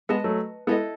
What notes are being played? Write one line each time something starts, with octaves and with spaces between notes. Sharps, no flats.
G#3 B3 B4 D#5 A5
F#3 A3
G#3 B3 E4 A4 D#5